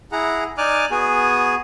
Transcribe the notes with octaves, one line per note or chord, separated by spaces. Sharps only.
E4 G#4 F#5 A#5
D#4 D5 G#5 D6 F6 F#6
B3 F#4 G#4 G#5